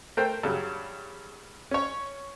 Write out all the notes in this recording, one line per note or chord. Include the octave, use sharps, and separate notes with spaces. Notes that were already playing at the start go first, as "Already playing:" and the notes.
A3 A#4 C5 G5
G2 C#3 F#3
C#4 C#5